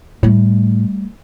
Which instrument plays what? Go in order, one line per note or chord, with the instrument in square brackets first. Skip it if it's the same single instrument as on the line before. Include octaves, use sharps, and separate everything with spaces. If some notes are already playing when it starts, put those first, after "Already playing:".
[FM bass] A2 [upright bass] G3 A3